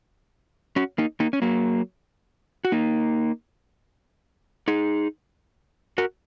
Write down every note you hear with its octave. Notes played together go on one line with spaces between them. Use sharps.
C#4 F#4
A#3 D#4
A#3 D#4
C#4
F#3 A#3
F#4
A#3 D#4
D#4 G#4
F#4 A#4